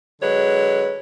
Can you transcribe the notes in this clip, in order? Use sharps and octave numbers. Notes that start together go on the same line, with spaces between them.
D3 F#3 G#3 B4 C#5